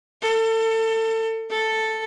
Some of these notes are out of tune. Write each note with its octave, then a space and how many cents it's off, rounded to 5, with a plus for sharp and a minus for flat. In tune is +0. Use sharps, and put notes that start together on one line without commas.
A4 +30
A4 +5